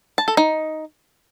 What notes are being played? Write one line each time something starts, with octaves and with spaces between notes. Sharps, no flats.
A5
A4
D#4